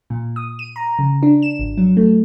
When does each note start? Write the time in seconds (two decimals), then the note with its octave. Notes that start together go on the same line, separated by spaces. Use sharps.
0.10 A#2
0.36 D#6
0.59 D#7
0.76 A#5
0.99 C#3
1.23 D4
1.42 E7
1.59 G#1
1.77 F#3
1.97 A3